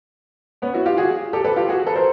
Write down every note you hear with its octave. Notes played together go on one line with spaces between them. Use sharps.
B3 C#4
E4 F#4
F4 G4
F#4 G#4
G4 A4
A4 B4
F4 G4
F#4 G#4
A4 B4
A#4 C5